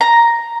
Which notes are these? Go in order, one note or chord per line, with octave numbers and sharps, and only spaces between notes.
A#5